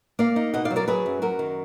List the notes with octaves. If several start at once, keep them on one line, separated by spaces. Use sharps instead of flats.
A#3 D5 F5
D#4
B2 D#5 F#5
D5 F5
F#3
A#4 D5
F#3 G#4 B4
F#2
F#2 F#4 A#4
D#3